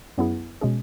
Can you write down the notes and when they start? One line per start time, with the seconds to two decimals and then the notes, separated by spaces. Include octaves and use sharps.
0.18 F#2 F#3 B3 E4 G#4
0.61 B2 G#3 C#4 G#4